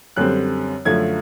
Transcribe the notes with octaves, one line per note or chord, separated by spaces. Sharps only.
F#2 D3 G3 C4 F#6
F#2 D3 F3 A3 G#6